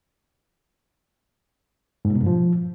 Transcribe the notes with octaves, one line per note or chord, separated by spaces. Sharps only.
G#2
A#2
B2
G2
F3